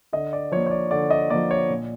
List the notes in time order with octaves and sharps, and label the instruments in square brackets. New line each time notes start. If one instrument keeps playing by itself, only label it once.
[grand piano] D3 D#5
D5
F3 A#3 C#5
C#5
D5
D3 D5
D#5
F3 A#3 D5
C#5
A#2